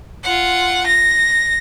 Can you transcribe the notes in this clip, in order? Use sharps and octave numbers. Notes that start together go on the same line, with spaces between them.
F4 F#5
A#6